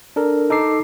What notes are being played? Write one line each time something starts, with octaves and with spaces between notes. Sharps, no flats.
D4 A4 A#4
D#4 A4 D6 C7